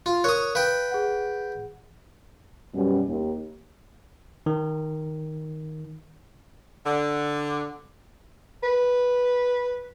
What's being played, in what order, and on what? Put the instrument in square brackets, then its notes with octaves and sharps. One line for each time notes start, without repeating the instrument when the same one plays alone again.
[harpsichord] F4
[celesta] A#4 F#6 [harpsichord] C#5 D#6
[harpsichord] B4 G5 [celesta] F5
[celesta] G#4 F#5
[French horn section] F#2 B2 G3
D#2
[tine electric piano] D#3
[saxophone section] D3
[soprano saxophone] B4